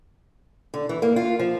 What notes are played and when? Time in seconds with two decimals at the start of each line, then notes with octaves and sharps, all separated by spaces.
0.74 D3
0.89 E3
1.02 A#3
1.16 F4
1.39 F3